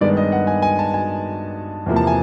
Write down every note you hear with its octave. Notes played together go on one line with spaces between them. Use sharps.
G2 D#3 G#3 B3 D5
D#5
F#5
G#5
G#5
A5
G#5
E2 C3 F3 A#3
A5
G#5